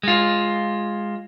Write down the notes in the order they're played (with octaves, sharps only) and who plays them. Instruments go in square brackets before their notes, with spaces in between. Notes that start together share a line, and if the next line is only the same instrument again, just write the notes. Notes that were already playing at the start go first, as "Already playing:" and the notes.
[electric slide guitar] G#3 F4